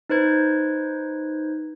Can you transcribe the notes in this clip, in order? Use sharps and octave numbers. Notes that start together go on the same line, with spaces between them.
D#4 B4 C5 G#6